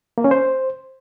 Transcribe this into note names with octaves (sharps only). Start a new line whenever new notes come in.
A#3
C#4
C5